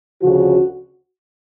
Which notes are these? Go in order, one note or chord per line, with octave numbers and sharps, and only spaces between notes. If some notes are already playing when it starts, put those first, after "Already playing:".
D2 C#3 F3 F#4